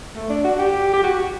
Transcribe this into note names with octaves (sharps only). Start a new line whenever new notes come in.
A3
D4
F#4
G4
G4
F#4